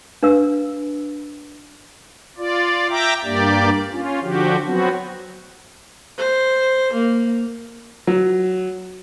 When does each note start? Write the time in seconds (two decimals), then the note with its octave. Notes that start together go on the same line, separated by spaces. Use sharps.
0.23 D4 B4 F5 E6
2.38 F4 D5
2.90 E5 G5 A#5 D6
3.24 G2 A#3 G4 D5
3.92 C#4 F4
4.22 D3 F3 F#4 G4
4.65 F#3 B3 C4 F#4
6.18 C5
6.93 A#3
8.07 F#3